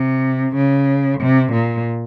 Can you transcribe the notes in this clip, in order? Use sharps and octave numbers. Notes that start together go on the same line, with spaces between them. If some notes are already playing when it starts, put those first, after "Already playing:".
Already playing: C3
C#3
C3
A#2